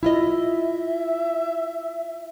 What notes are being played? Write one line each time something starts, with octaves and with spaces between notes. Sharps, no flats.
E4 F4 D#5 E5